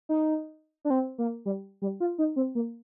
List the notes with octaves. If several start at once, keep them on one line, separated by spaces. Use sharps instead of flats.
D#4
D4
C4
A#3
G3
G3
F4
D#4
C4
A#3